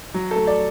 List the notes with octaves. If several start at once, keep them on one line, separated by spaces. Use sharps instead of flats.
F#3
A4
A3
D5